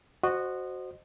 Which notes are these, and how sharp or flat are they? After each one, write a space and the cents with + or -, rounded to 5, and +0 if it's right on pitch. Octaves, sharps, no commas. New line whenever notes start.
F#4 +0 C5 +0 D#5 -25